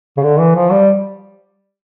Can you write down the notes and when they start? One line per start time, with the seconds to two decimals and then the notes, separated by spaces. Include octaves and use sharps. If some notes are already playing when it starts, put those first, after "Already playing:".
0.17 C#3
0.23 D3
0.39 E3
0.55 F3
0.71 G3